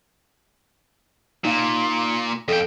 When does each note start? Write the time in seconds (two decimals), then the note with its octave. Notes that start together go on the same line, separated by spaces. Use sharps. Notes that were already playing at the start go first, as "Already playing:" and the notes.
1.45 A#2 D#4 F5
2.48 F2 A4 G5